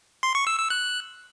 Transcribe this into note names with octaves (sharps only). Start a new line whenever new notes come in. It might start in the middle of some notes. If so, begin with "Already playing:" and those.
C6
C#6
E6
E6
F#6